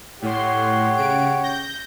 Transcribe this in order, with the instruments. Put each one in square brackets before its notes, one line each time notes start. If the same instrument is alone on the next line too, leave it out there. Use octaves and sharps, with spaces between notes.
[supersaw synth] A2 C6 [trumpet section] G4 C#5 F#5
[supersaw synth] C#3 D7
G6 A#6